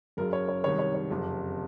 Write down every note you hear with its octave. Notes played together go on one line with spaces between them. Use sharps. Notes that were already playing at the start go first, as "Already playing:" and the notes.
F#1 F#2 C#3 A#4
C#5
C#5
C2 C3 D#3 C#5
C#5
C#5
F#1 F2 C3